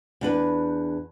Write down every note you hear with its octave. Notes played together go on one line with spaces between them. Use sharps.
E2 D4 B4